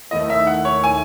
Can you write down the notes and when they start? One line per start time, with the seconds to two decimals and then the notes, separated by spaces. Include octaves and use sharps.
0.11 D#2 D#3 A3 E4 D#5
0.30 E5
0.47 F#5
0.65 C#5
0.84 G#5